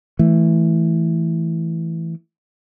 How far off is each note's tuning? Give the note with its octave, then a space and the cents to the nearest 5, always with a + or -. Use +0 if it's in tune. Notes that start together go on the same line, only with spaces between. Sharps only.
E3 +0 A3 +0